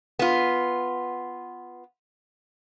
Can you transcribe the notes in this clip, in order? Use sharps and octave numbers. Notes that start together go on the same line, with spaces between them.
B3 F4